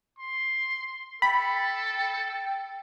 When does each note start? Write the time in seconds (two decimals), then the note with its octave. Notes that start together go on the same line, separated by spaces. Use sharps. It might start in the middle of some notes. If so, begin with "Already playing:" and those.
0.19 C6
1.22 A4 G5 B5